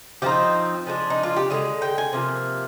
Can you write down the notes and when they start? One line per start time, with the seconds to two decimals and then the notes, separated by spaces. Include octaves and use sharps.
0.22 F3 C4 D#4 G4
0.87 F3 G#3 D4
1.10 D#4
1.23 F4
1.37 G4
1.50 D3 F3 G#3 G#4
1.82 G5
1.98 G#5
2.13 C3 F3 A#3